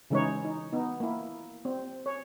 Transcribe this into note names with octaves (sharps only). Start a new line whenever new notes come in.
C#3 E3 G#3 D#4 E4 C#5
D#4
B3 D#4
A#3 E4
C4
C#5